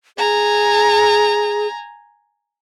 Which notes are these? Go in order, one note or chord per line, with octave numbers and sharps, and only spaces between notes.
G#4 G#5 A#5